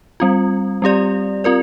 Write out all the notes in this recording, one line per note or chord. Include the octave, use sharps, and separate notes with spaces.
G3 C4 F4
G3 C4 G4 D5
C4 F4 A#4 D5